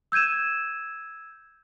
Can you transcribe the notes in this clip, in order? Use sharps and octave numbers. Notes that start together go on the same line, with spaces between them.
E6 G6 G#6 D#7 E7